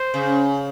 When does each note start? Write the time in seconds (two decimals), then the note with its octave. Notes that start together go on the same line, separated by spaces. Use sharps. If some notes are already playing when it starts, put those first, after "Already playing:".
Already playing: C5
0.14 C#3